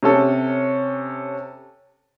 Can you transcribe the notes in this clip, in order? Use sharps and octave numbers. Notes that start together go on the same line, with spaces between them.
C3 C#4 A4